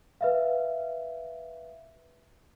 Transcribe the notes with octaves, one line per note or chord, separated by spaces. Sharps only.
B4 E5 F5